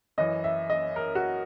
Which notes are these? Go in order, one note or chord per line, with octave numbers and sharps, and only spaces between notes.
F#2 E3 D#5
E5
D#5
A#4
F#4